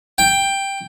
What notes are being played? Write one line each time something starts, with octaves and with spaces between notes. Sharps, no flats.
G5